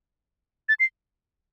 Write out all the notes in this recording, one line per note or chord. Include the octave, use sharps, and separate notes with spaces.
A6
C7